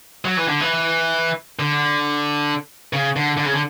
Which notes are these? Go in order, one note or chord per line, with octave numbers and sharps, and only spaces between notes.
F#3
E3
D3
E3
D3
C#3
D3
D3
C#3
D3